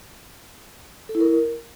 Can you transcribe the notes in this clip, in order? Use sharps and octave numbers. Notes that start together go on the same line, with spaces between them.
A4
E4
A#4